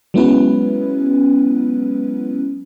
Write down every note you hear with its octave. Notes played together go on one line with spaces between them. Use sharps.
F#3 G#3 B3 C#4 E4 B4